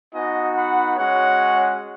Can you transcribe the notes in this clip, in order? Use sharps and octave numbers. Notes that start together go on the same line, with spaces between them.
B3 D#4 F#4 D#5 G#5
F#5 B5
G#3 C#4 F#4 C#5 F#5